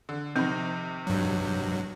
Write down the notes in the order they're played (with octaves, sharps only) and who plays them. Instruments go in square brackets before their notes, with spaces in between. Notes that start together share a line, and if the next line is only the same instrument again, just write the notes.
[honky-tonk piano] D3
[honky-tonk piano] C3 D#3 D#4 [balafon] F3 C4
[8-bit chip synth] G2 F#3